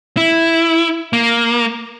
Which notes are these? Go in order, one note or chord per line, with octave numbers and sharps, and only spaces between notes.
E4
A#3